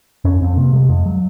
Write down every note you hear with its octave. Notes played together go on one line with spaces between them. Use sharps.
F2 C#4
F2 C4
C3 A#3
C3 G#3
F2 G#3
F#3